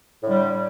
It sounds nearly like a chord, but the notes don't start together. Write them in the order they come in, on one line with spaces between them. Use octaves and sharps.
A2 D3 G3